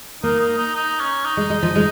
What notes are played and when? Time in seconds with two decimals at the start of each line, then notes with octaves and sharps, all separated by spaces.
0.23 A#3 D#4
0.40 D#4
0.57 D#4
0.74 D#4
1.00 C#4
1.24 D#4
1.37 G#3
1.50 G#3
1.62 F3
1.75 G#3